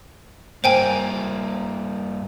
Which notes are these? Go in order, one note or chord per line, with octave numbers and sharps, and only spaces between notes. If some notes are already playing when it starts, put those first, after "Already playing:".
G2 A#3 C5 G5 G#5